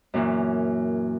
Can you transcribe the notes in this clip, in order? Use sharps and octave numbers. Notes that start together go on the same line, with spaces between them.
F#2 A#2 E3